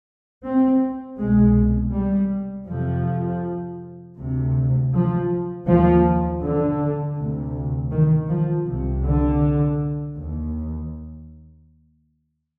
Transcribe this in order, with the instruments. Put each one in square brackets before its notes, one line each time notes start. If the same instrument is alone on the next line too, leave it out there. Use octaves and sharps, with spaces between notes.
[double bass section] C4
C2 B2 G#3
G3
F2 C3 F3
D2 C3
F3
D#2 F3
D3
D2 C3
D#3
F3
C2 C3
D3
D#2